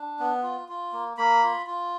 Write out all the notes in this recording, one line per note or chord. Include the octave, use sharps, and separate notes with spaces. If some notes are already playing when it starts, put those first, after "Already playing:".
Already playing: D4
B3
F4
F4
A#3
A#3 B5
F4
F4